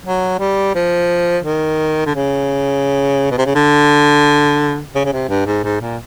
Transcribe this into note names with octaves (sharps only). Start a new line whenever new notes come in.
F#3
G3
F3
D#3
D3
C#3
B2
C3
C#3
D3
C#3
C#3
C3
G2
G#2
G#2
A#2